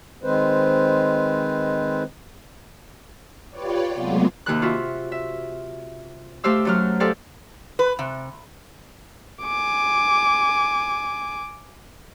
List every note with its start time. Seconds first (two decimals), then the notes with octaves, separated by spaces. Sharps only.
0.23 D#3 G#3 C4 B4 C5
3.50 F4 G4 B4 C#5 D5
3.93 C3 F#3 G#3 A3 B3 F4
4.46 D#2 C3 D#3 F#6
4.62 F4 F#4 E5
5.12 E5
6.44 A3 G4 C5 F5 E6
6.65 F#2 F#3 F6
7.00 G4 A4 C5 D5 F5 G5
7.79 B4
7.99 C3
9.43 G#5 D6